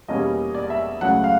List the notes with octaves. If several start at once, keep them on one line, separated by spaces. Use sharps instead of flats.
E2 B2 G3 A#3 C#4 D#5
D5
E5
C#2 C#3 F#3 A3 F#5
F5